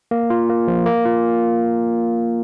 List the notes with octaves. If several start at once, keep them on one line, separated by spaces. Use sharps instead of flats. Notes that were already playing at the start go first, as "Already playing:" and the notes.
A#3
F4
A#3
F3
A#3
F4